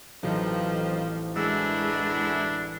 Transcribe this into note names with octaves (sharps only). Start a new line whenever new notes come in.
A1 F2 F3 F#3 D#4
F#2 G#3 D4 E4 E6